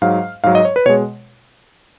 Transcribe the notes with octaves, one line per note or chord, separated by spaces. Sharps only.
G#2 F#3 F5
G#2 F#3 F5
D#5
C#5
B4
B2 G#3 C#5